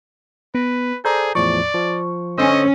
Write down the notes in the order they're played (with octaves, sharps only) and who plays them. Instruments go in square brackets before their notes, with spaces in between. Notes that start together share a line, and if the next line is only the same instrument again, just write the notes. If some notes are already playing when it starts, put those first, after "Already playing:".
[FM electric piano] B3 [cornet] B4
[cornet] G#4 [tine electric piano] A4 C5 D5 [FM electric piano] A#5 G6
[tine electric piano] E2 A2 F3 [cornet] D5 [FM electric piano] C#6
[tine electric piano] F3
[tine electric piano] D3 C5 E6 [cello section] C#4 [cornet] D#5